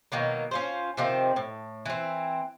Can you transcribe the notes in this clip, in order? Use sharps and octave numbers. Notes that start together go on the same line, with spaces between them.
B2 D#3 F#3 A#3
C#4 F4 C5
C3 D#3 F3 C4
A2
E3 C4